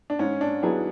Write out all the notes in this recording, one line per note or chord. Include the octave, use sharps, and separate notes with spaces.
D4
G#2 C#4
D4
F#3 B3 D4 E4 G#4